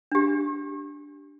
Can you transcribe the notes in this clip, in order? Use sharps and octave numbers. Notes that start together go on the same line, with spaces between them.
D4 G4